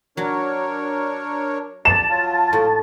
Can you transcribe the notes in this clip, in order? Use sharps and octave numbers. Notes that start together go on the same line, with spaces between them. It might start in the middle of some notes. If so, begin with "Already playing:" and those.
F#3 D4 A#4 C#5
F2 D5 A5 E7
F#3 F4
A2